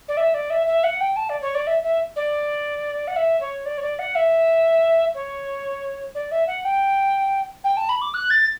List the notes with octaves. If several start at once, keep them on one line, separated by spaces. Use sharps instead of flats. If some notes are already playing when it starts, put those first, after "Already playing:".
D5
E5
D5
E5
E5
F#5
G5
A5
D5
C#5
D5
E5
E5
D5
F#5
E5
C#5
D5
C#5
D5
F#5
E5
C#5
D5
E5
F#5
G5
G5
A5
B5
D6
F#6
A6